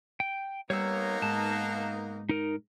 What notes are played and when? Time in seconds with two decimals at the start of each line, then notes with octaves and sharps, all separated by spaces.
0.20 G5
0.70 G3 A#3 B3 D#4 C#5 E6
1.22 G#2 A5
2.29 D#4 A#4